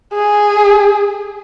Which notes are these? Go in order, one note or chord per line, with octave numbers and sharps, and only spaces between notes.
G#4